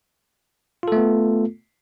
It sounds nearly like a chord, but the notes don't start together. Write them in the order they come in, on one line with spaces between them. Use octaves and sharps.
F4 A4 A3 B3